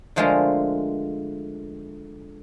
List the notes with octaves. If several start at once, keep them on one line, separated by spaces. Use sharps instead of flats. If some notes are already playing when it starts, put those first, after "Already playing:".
D3 F3 G#3 A3 F4 A#4